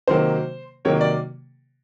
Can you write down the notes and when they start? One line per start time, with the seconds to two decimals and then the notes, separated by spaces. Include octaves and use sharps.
0.08 C3 D#3 F#3 A#3 C5
0.85 C3 D#3 F#3 A#3 C#5
1.01 D5